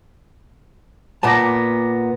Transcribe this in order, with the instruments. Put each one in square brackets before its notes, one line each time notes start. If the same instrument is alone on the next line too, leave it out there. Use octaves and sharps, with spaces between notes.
[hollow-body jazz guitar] A#2 B3 A5 [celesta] A#5 D6 A#6